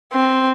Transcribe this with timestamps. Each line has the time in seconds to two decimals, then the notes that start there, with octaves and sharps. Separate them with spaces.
0.13 C4